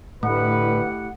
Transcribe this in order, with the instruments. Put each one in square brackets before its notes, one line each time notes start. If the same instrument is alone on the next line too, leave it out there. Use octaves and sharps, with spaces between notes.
[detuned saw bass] A2 [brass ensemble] D3 B4 [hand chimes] A3 [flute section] E4 G4 F#5